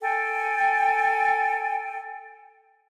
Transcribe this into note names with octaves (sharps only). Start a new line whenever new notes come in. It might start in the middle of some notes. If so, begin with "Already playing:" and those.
A4 G5 G#5